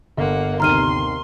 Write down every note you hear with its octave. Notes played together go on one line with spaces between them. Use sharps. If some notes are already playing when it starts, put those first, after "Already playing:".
G1 A#3 F#5
D#2 C3 D#3 A#5 C6 F6 D#7